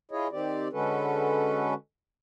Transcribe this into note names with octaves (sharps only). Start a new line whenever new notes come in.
E4 F4 G#4 C#5 D#5
D#3 C4 G4 D5
D3 G#3 C#4 F#4 A4 B4